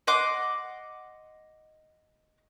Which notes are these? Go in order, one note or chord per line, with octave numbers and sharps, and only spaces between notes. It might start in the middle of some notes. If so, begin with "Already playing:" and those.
D#5 F#5 C6 D6